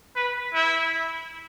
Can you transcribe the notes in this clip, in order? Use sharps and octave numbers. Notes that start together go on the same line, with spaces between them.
B4
E4